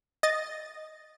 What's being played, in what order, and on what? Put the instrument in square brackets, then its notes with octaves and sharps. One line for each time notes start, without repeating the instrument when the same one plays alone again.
[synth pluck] D#5 A6